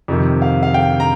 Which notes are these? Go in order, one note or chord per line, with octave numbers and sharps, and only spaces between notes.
F2 C3 D#3
F5
F5
G5
A#5